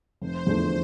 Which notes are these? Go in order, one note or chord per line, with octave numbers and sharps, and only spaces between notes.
F1 C5
E2 D3 F3 A3